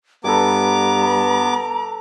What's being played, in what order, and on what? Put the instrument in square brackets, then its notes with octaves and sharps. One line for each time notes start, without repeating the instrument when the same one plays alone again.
[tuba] G2 [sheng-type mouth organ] B3 D6 [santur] A4 B4 G#5 [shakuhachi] A#5